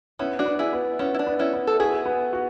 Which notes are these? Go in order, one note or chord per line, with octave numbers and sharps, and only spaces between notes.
B3 C#4 E4
D4 F#4
B3
E4 G#4
B3
B3 C#4 E4
E4
D4
B3
C#4 E4
B3
A4
E4 F#4 G#4
B3
F#4